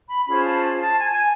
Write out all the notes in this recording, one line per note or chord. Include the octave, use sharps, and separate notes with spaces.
B5
C#4 F4 G#4 C5 B5
A5
A5
G#5
G#5